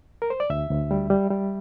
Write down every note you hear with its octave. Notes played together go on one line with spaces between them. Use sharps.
A#4
C5
D5
D2 E5
D2
G3
G3
G3